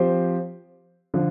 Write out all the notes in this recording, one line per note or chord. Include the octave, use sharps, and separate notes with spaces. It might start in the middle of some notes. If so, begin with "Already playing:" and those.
Already playing: F3 C4 G4 C5
D3 F3